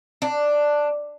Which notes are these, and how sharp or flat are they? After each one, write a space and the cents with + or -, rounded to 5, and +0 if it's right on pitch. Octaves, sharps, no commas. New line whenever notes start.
D4 +5